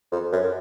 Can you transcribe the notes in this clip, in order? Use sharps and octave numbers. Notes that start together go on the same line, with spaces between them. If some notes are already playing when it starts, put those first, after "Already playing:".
F2
F#2